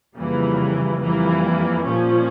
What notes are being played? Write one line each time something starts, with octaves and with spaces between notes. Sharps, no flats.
F2 C#3 E3 G3 A#3
F2 E3 G3 A#3
A#2 F3 C#4